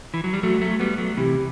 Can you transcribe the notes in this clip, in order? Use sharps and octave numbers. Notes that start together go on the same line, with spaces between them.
E3
F#3
G3
F#3 A3 F#4
F#3 A3
G3 B3
F#3 A3
C3 E3 G4